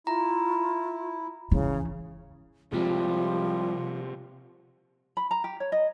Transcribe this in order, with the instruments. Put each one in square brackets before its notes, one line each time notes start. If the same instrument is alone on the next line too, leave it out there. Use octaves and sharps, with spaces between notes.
[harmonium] E4 [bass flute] F4 [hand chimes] A#5
[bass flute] C#3 [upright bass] E3
[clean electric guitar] C2 G3 [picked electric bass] C3 G#3 [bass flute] F3 [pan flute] F4
[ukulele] B5
A#5
G4
C#5
D#5